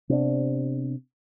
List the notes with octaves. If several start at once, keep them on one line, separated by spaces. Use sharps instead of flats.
C3 B3 D4